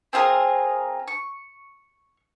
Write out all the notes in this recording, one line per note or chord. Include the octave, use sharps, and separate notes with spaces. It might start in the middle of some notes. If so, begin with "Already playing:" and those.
C4 F4 G#4 A#4
C#6